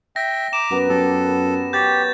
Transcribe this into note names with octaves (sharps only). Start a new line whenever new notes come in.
E5 G5 A#6
A#5 D6 E7
F#2 B3 A#4 B4
F#2 G4 A4
G4 C#5 G6 A6